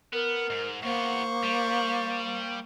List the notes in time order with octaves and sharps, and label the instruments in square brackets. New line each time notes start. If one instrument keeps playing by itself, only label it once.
[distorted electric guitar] B3 [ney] A#4
[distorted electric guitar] G#2
[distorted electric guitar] E2 B3 [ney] A#3 [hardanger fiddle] C5 C#6
[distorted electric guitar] G3